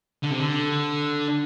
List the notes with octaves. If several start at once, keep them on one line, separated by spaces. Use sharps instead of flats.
D3
C3
D3